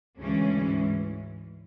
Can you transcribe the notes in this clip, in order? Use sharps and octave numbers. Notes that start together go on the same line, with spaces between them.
D2 C#3 E3 G#3 C#4
G#2 E3 G#3